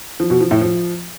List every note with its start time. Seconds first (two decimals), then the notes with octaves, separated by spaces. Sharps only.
0.20 F3
0.30 B2
0.41 F3
0.51 A2
0.61 F3